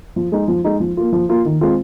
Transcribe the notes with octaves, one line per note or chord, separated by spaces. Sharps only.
F3
G#3 D#4
F3
G#3 D#4
F3
A#3 F4
F3
A#3 F4
D#3
G#3 C4 F4